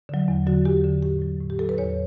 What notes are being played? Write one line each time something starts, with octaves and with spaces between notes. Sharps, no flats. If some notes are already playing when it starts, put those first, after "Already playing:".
D3 F#3
E2
D3 F#3 F#4
E2 G4
D3 F#3
A2 G4
F#3
A2
G4
F#3 A4
B4
E2 C#5